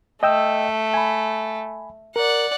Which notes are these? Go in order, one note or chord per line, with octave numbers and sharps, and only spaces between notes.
A3 D#5 G5 E6
G#5 B5
A#4 D5 F#5